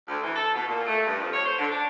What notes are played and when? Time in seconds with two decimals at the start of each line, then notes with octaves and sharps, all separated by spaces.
0.08 D2
0.24 E3
0.36 A4
0.55 B2
0.68 A#2
0.87 A3
1.06 G2
1.21 F2
1.34 C#5
1.46 C5
1.59 D3
1.72 D4